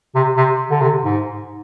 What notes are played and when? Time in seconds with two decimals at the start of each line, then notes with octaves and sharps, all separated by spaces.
0.15 C3
0.37 C3
0.71 D3
0.81 C3
1.04 G#2